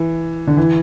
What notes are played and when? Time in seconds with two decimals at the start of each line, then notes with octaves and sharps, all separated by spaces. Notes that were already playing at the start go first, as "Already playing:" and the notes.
Already playing: E3
0.47 D3
0.57 E3